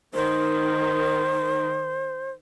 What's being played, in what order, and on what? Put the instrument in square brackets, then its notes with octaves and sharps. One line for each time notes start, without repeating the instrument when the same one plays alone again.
[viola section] D#3 [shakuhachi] C5